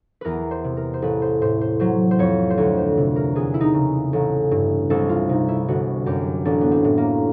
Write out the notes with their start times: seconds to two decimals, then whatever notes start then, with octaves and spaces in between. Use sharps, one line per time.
0.21 E2 A#4 B4
0.51 C5
0.64 C3
0.77 A#4
0.94 C5
1.02 A1 B4
1.22 C5
1.41 A2 C5
1.61 C5
1.80 F#3 C5
2.11 C5
2.19 F2 C#5
2.50 C5
2.57 D2 C#5
2.77 C5
2.97 C3
3.16 A#4
3.35 E2 G#4
3.54 E4
3.61 D#4
3.74 C#3
4.13 A1
4.51 G2
4.90 C2 A4
5.09 F4
5.29 C3 D#4
5.48 E4
5.68 G1 F#4
6.06 F#2 G4
6.45 A1 D4
6.61 B3
6.71 C4
6.84 A2
6.98 A#3